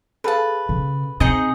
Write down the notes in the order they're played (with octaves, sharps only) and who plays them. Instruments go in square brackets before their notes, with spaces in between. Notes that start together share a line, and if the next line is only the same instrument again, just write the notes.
[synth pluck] G#4 A4 F5 [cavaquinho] B4 A5
[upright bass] C#3
[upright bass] C3 [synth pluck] C4 G6 C#7 [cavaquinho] D#4 G#4 D#5